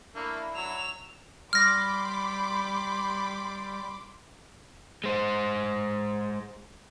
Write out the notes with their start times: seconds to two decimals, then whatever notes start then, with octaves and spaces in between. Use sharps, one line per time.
0.15 A3 A#3 D4 E4
0.55 F#3 E6 F7
1.53 G3 B5 C6 D6 F6 A#6
5.04 G#3 C5